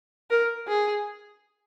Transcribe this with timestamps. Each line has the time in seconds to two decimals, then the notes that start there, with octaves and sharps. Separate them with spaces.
0.31 A#4
0.68 G#4